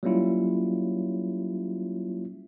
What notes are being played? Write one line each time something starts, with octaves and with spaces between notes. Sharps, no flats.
F#3 G3 A#3 C#4 E4 F4